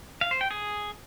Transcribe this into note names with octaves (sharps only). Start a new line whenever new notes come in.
F5
C5
G5
G#4